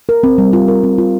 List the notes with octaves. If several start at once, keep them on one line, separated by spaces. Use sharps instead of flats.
A#4
C4
G3
F4
A#4
C4
F4